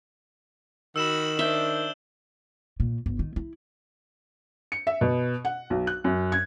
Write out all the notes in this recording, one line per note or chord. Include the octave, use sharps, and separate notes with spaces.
D#3 F#4 B5 E6 E7 F#7
D4 C5 E5 G6 G7
A#2
G1
D#3
E4
C#7
E5
B2
F#5
B1
F#6
F#2
G#6